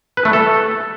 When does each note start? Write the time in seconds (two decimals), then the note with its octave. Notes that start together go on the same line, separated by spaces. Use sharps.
0.17 B4
0.25 A3
0.33 A4